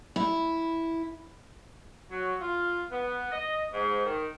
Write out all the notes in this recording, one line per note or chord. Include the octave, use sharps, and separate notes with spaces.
E4
F#3
F4
B3
D#5
G#2
D#3